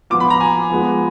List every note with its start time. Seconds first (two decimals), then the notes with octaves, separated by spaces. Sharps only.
0.10 F3 B3 F4 D6
0.20 B5
0.30 A#5
0.40 G#5
0.70 F3 G#3 B3